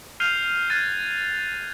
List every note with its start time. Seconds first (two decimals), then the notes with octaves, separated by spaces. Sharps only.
0.20 F6 G6 C7 D#7 F7 G7
0.70 F6 F#6 G#6 A6 C7 D#7